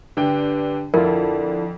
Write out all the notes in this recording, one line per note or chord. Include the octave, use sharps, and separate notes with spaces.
G2 D3 G5
F2 D3 E4 F4 A#4